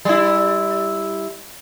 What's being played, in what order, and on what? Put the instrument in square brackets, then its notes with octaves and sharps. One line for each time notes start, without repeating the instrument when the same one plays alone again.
[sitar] G3 E4